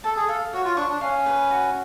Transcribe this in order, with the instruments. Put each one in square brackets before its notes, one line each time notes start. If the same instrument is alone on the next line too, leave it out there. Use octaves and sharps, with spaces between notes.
[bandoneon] A4 [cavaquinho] A5
[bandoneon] G#4
[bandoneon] A4 [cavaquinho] F5
[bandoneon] F#4 [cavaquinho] C#5
[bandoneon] F4
[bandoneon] D4 [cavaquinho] C#6
[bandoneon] D4
[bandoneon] C#4 [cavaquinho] F5
[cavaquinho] B4
F#4